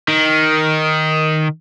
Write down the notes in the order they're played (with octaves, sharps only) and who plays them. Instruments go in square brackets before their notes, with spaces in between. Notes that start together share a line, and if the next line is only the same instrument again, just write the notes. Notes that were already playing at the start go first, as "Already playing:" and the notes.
[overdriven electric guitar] D#3